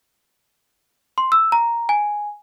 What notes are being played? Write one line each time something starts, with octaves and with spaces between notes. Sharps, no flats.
C6
E6
A#5
G#5